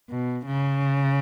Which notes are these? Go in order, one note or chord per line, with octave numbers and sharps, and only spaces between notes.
B2
C#3